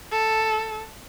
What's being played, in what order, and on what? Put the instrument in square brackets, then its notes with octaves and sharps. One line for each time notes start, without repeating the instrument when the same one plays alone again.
[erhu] A4